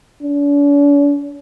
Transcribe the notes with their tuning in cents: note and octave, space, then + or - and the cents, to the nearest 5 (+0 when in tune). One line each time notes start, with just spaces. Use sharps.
D4 -45